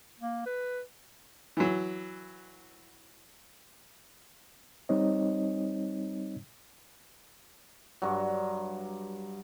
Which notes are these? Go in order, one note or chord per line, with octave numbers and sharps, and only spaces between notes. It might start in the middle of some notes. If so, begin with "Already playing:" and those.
A#3
B4
E3 F#3
G3 C4 D#4 C#5 D#5
G2 F#3